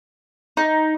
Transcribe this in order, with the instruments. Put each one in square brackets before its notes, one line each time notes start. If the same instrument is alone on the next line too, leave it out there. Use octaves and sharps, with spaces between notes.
[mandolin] D#4